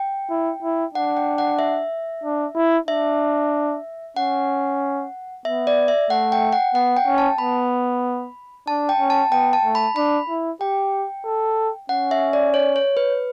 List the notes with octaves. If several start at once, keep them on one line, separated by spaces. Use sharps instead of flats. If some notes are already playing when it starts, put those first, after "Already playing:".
Already playing: G5
E4
E4
D4 F#5
G5
F#5
E5
D4
E4
D4 E5
C#4 F#5
B3 E5
D5
E5
A3 F#5
G5
F#5
B3 F#5
G5
C#4
A5
B3 B5
D4 A5
G5
C#4
A5
B3 G5
A5
A3
B5
D4 B5
E4
G4 G5
A4
C#4 F#5
E5
D5
C#5
C#5
B4